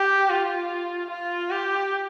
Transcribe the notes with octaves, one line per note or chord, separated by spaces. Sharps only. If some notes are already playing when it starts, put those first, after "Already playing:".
Already playing: G4
F4
F4
G4